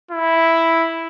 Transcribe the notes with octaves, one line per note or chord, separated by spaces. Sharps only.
E4